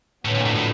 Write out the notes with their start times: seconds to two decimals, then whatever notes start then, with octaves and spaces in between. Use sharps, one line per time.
0.24 F2 A2 D3 F#3 B3
0.35 A#2
0.45 A2
0.56 A2